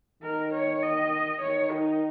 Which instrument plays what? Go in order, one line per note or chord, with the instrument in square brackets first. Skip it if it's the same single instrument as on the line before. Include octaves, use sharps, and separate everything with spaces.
[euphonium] D#3 [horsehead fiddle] A#4
[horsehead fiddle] C#5
D#5
[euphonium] D#3 [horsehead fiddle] C#5
[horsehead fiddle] D#4